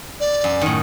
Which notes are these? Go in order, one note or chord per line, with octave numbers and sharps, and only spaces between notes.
D5
F#2
A2 D#3